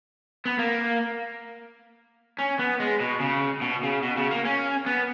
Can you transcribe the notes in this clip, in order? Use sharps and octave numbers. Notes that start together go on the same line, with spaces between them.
B3
A#3
C#4
B3
G#3
B2
C#3
B2
C#3
B2
C#3
A#3
C#4
B3